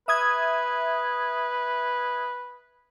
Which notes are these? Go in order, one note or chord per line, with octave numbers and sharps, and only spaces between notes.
B4 E5 D#6 G#6